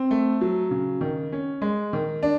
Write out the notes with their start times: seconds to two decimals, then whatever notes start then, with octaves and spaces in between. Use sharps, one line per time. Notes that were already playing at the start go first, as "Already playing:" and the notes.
Already playing: C4
0.11 A3
0.41 F#3
0.71 C#3
1.01 D#3
1.32 C#4
1.62 G#3
1.93 D#3
2.23 D4